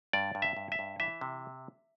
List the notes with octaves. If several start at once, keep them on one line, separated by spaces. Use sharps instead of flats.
G2 D5
G2
E5
G2
E5
G2
E3 E5
C3